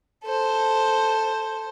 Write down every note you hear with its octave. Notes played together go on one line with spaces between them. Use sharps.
A4 C5